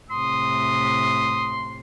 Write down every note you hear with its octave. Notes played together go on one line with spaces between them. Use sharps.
A2 C3 C6 D#6